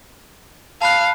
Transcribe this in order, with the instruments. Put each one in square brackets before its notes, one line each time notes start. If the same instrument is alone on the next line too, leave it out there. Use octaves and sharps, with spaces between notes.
[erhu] F5 [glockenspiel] A5 B5 F#6